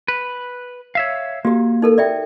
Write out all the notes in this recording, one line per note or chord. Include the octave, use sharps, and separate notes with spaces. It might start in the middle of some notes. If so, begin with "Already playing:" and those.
B4
C#5 E5 F5
A#3 F#4 G4
D#4 A4 A#4
D5 E5 G5